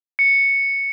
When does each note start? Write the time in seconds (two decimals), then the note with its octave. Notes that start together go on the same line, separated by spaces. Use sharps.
0.19 C#7